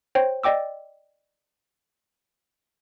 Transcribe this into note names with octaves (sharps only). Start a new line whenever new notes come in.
C5 C#5 G5
D5 D#5 G5 D6 E6